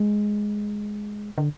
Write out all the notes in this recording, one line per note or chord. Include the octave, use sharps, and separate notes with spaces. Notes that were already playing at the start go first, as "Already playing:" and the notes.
Already playing: G#3
D3